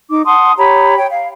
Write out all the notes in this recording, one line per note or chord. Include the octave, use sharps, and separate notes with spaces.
D#4 D6
F#5 A5 C6 D#6
G4 C#5 A#5 B5
C#5 G5
F5